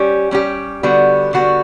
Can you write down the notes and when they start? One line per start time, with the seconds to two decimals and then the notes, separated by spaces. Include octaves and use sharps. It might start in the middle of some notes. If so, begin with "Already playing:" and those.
Already playing: G3 C#4 G4
0.31 G3 C#4 G4
0.83 D3 G3 B3 F#4
1.33 D3 G3 B3 F#4